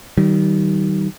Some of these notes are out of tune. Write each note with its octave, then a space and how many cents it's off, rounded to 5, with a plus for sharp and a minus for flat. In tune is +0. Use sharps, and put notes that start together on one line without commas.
D#3 +0 G3 -40